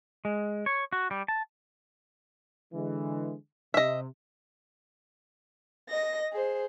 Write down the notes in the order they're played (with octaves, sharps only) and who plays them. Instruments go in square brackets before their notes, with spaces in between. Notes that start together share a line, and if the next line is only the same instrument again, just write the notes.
[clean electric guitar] G#3
C#5
F#4
G3
A5
[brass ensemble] D3 E3 G#3
[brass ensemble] C3 [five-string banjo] D#5 E5
[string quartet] D#5 A#6
G#4 C5